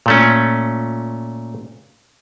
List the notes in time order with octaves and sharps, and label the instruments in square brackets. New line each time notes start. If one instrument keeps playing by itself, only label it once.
[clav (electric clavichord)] A#2 A3 C#4